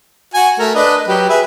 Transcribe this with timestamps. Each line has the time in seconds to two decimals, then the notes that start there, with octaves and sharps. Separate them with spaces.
0.34 F#4 G#5
0.59 A3 A#4
0.75 D4 B4 D#5
1.08 F#3 G4 B4
1.29 G#4 B4 E5